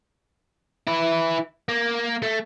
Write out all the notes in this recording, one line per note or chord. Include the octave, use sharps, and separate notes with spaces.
E4 B4
A#3
A3